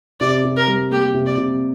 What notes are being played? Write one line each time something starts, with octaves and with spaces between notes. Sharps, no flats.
C3 D5
C3
A#4
G3
A#3 G4
C3
D5
C3